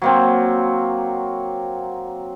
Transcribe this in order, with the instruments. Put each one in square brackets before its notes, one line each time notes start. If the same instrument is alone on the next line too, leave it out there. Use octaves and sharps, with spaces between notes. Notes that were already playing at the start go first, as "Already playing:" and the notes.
[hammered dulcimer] F#3 A#3 C4